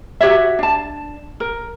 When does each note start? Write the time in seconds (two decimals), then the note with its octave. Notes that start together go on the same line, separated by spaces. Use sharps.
0.21 F#4 G4 C#5 E5
0.59 D4 A5
1.40 A#4